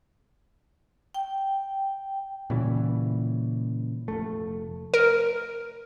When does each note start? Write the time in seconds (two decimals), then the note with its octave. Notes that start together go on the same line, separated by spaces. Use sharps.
1.14 G5
2.50 A#2 C#3 E3 G3
4.08 F1 C#2 A3
4.94 A#4